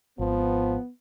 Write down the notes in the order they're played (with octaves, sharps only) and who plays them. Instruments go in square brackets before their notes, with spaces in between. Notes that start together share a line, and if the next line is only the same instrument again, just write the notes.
[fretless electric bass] G#1 [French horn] F3 [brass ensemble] B3